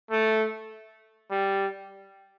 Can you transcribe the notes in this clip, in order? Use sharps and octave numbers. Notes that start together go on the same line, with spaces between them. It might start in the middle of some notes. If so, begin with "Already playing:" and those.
A3
G3